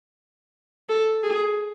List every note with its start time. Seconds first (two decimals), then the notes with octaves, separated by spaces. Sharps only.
0.89 A4
1.23 G#4